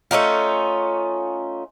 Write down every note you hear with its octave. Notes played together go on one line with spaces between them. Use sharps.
A3 C#4 D#4 F4